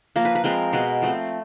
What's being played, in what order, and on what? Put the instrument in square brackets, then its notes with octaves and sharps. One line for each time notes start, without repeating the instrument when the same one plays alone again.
[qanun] F3 A#3
B4
B4
F3 G#3 C4 A#4
B2 G#3 B3
F3 A3 C4